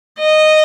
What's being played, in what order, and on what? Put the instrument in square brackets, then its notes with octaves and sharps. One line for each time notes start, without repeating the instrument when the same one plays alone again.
[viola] D#5